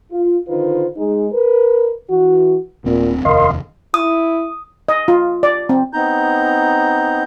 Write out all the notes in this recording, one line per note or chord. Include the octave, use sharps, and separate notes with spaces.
F4
D3 D#3 D#4 F4 B4 C5
G#3 D#4 G#4
A#4 B4
E3 F#4
D#1 A#2 C4
F1 D#2 A#4 D#5 F5 C6
E4 D#6
D#5
F4
D5
C4
B3 C4 D#4 A#5 G6